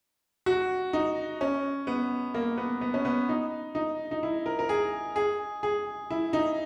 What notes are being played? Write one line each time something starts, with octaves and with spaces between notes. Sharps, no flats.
F#4
D#4
C#4
B3
A#3
B3
B3
C#4
B3
D#4
D#4
D#4
E4
A#4
A#4
G#4
G#4
G#4
E4
D#4